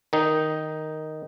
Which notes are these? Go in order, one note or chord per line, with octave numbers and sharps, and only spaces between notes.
D#3 D#4